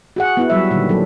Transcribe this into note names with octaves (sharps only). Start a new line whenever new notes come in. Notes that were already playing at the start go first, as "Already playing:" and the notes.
F#4 G#4 F#5
B3 E4 F#4
F#3 G3 E5
A#2 D3 D#3 G3
F#3 A4